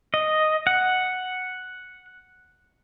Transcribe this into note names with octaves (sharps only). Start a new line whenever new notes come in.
D#5
F#5